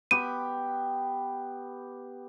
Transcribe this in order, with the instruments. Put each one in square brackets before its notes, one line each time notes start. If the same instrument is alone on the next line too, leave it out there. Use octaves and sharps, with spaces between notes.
[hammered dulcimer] B3 G4 [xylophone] D#7